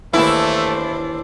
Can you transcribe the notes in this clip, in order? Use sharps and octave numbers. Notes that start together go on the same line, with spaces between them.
D#2 E3 A3 D4 E4 C5